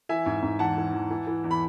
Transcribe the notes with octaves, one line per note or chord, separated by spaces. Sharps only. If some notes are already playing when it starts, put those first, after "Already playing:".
E3 E5 G#5
G#2
G#2
E2 F#5 A5
E3
E2
E3
E3
E2
B5